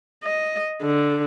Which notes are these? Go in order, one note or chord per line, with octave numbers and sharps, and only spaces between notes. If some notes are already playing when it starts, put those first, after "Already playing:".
D#5
D3